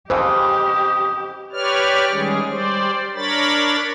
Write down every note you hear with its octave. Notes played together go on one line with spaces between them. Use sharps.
F2 C#3 E3 G4 C5 D#5
G4 B4 C#5 D5 F6
D#3 G3 G#3 C#4 G#4
G3 C5 D5
D4 A#4 C#5 B5 A6